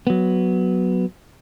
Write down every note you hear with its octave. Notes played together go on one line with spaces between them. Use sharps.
F#3 B3